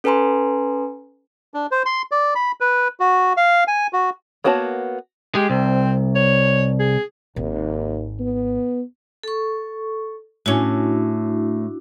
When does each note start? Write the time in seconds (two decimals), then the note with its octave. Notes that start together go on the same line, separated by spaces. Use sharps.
0.04 C#4 A4 B4 G#5 A#5 C6
1.54 D4
1.71 C5
1.86 C6
2.11 D5
2.35 B5
2.60 B4
3.00 F#4
3.37 F5
3.68 G#5
3.93 F#4
4.44 A#3 B3 F#4 C#5 A5
5.35 G#3 G4
5.50 C2 C4
6.15 C#5
6.79 G#4
7.36 G#1 D#2
8.19 B3
9.23 A4 C#6
10.46 A2 C#4 D4 E4 F#4